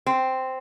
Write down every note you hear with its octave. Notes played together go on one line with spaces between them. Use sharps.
C4